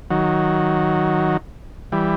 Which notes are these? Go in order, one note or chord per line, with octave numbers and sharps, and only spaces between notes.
D#3 F#3
E3 G3